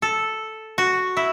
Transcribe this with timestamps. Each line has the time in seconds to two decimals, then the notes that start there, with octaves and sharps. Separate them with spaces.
0.02 A4
0.78 F#4
1.17 E4